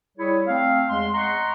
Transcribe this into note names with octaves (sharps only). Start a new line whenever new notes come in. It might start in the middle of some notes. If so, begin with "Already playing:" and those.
G3 E4 G#4 C#5
A3 C4 F5
E2 G#3 C6
D#5 F#5 A#5 C6 C#6